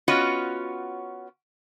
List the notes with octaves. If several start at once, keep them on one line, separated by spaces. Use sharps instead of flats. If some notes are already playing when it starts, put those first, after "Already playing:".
B3 C#4 F4 F#4 C#5 D#5